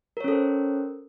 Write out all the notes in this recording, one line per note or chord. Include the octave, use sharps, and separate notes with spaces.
C#4 A4 A#4 C5 C#5